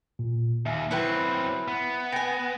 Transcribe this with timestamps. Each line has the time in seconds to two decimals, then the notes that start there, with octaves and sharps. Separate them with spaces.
0.19 A#2
0.66 D#2 E5 G#5
0.91 F#3 C4 E4 B4 G5
1.68 B3
2.12 G5 G#5 A#6